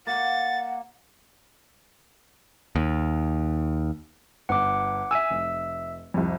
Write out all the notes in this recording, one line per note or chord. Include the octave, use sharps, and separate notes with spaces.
A#3 F#5 A6
D#2
G1 F#5 D6
E5 G#5 E6 D#7
F1
C2 F2